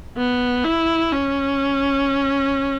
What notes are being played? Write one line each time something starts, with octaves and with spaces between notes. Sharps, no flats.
B3
E4
C#4